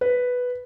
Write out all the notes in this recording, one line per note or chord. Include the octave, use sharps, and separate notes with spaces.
B4